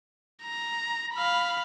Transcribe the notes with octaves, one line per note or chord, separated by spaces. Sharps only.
A#5
F5 B5